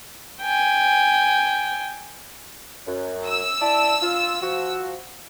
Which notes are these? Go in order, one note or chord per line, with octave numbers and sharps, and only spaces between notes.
G5 G#5
F#2
E6
E4 D5 A5
F4
F3 F#4